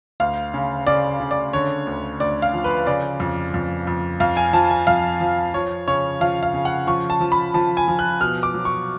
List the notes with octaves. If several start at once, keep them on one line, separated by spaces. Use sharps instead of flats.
D2 F5
C#3
C#3 D5
C#3
D5
D3 C#5
D2
D2 D5
F5
F3
B4
C#3 D5
F2
F2
F2
F2 F5
G#5
F3 A5
G#5
F2 F5
F3
F3 C#5
C#3 C#5
F3 F5
F5
C#3
F#5
F3 C#6
A5
F3
B5
F3 A5
G#5
F3
F#6
B2 F6
D6
F#3
C#6